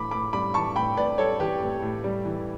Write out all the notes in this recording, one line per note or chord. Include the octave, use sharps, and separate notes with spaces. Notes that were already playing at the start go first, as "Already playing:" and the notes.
Already playing: A2 E3 B5 D6
A2 B5 D6
G3 B5 D6
E3 A5 C#6
A2 G5 B5
A2 B4 D5
G3 A4 C#5
E3 G4 B4
A2
A2
G3
E3